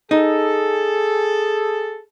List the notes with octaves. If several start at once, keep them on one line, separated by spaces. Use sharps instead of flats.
D#4 G#4 A4